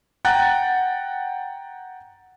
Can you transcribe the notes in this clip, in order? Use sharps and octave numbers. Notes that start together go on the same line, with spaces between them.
F#5 G5 A#5 F#6 A6